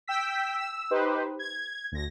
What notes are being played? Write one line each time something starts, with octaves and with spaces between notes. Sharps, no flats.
G5 E6 B6
E6
D#4 G4 B4 C5
G#6
D2 A#6